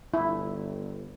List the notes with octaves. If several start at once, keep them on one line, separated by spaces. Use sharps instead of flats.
G1 E4